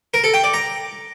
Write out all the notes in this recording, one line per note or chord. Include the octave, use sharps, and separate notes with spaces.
A#4
A4
G5
D5
A#5